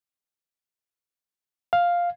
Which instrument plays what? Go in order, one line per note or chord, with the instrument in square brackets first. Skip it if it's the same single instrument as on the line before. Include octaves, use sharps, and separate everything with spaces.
[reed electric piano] F5